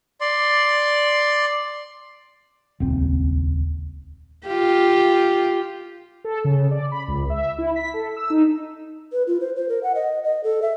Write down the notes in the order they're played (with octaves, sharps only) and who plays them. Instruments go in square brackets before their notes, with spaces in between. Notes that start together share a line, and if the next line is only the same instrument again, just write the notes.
[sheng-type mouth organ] D5 C6
[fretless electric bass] D#1 G#1 C#2 C4
[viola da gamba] F4 G4
[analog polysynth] A4
C#3
D5
B5
C#2
E5
E4
B6
A4
E6
D#4
[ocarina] B4
F4
C5
C5
A#4
F#5
D#5
D#5
A4
E5